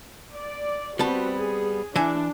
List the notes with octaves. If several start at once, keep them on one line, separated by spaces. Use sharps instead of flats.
D5
G3 B3 C4 F#4 A5
G#4
E3 D4 E5 G#5